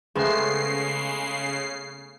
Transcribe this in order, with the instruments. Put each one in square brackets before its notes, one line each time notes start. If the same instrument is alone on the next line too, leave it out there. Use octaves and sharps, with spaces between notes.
[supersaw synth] C#3 C7 [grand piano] G#3 [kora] A3 B3 C4